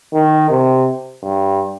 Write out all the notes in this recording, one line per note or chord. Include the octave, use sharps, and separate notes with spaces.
D#3
C3
G2